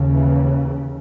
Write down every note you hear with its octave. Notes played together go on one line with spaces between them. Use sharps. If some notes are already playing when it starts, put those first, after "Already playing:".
Already playing: D#2 C#3
E3